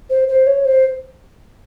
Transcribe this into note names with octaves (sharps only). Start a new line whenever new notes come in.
C5
C5
C#5
C5